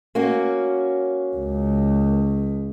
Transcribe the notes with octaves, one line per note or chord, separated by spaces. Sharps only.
A#3 C#4 F#4
C#2